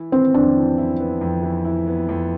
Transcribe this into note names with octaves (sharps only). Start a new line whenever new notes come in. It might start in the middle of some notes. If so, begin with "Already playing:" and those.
Already playing: E3 E4
B3 C4
F2 D4
E3
E4
B3
F2
E3
E4
B3
F2